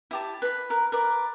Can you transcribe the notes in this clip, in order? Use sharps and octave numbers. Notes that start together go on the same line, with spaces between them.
E4 G4 A5
B4 B5
A#4 B4
A#4 B4 D5